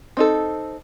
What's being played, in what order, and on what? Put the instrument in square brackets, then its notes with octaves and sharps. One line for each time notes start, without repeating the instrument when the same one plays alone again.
[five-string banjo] C4 D#4 A4